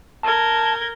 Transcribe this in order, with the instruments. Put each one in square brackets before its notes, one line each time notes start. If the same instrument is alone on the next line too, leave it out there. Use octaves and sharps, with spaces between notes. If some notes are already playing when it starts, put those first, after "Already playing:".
[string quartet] A#4 G6 G#6 [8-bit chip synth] A5